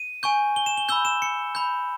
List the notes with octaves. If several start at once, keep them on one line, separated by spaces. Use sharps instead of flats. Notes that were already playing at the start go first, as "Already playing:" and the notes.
Already playing: D#7
G#5 C#6 G6
G7
E7
G7
B5 E6 G6 G7
E7
C#7
B5 G6